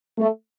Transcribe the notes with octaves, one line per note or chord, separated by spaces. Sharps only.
A3